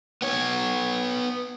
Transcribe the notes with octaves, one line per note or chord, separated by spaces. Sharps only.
B3 C#5